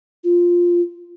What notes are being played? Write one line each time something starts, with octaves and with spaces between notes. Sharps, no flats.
F4